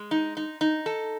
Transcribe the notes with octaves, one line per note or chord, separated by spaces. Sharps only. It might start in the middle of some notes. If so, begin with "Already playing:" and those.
Already playing: G#3
D#4
D#4
D#4
A4